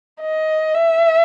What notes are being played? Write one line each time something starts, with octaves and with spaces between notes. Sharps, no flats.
D#5
E5